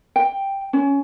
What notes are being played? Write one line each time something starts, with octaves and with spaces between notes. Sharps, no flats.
G5
C#4